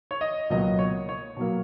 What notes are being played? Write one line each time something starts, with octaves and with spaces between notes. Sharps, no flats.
C#5
D#5
C#2 B2 F#3 A#3 D#5
C#5
C#5
B2 F#3 A#3